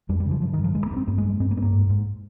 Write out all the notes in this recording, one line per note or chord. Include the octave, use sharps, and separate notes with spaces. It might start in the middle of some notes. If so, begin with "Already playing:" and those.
F2 G3
G3
C#3
F3
G2 F3
D#3
G2
F3
G2 G#3
A#3
G2
C4
G2 A#3
G#3
G2
G#3
G2 C4
A#3
G2 C4
A#3
G#2
G#2